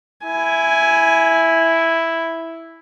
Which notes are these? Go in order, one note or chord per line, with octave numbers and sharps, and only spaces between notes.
E4 G#5